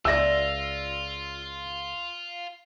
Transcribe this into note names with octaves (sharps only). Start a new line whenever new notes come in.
C#2 F4 D5 E5 G#5 E6 A#6